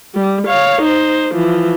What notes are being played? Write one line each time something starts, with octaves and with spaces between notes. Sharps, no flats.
G3
C#5 F5
D#4 C5
E3 F3